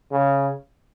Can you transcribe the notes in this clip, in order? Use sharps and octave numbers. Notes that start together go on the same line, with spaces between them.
C#3